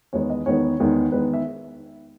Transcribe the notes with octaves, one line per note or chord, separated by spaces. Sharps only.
E2 D#3 G#3 B3 D#4 C#5
D#5
E2 D#3 G#3 B3 D#4 C#5
E2 D#3 G#3 B3 D#4
E2 D#3 G#3 B3 D#4 B4
E5